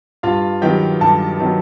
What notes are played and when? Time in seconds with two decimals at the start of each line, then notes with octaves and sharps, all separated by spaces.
0.23 G2 F4 F5
0.62 D#3 F#3 B3 G4 G5
1.01 G2 A4 A5
1.40 D#3 F#3 B3